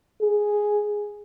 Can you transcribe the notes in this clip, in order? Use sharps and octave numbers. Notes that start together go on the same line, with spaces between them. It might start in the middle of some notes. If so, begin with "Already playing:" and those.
G#4